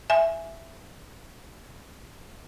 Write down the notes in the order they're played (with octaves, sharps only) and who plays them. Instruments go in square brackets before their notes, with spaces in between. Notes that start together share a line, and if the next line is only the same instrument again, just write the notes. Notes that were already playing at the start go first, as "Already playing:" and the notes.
[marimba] E5 G#5